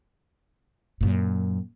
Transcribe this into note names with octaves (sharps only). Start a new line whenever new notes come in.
F#2 A#2